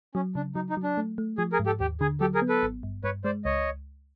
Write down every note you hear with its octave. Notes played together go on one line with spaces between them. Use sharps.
F#3 C#4
C#3 D4
F#3 D#4
D#4
F#3
D4
A3
A3
F3 G#4
G#4 A#4
G#2
G4 A4
D#2 G4
D3 G#4
F#3 G4 A4
G#4 A#4
B3
A4 B4
G#1
G2
G2 B4 C#5
G#3 C5 D5
C#2 C#5 D#5